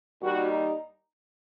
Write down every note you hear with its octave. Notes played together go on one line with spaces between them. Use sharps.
D#2 D#3 G3 F#4
D#4